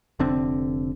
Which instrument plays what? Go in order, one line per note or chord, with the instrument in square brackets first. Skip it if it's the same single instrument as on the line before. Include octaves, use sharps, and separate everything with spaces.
[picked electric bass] F1 D3 C4